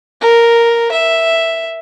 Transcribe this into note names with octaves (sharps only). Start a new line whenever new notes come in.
A#4
E5